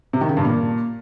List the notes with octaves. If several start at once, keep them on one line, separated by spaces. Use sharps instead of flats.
C3
D#3
C#3
G2
A#2